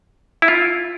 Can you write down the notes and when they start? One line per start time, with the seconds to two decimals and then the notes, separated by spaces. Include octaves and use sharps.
0.42 E4
0.48 F4